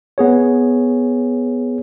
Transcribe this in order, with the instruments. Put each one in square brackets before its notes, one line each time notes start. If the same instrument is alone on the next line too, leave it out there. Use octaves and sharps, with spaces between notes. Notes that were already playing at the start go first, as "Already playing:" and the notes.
[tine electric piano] B3 G#4 C#5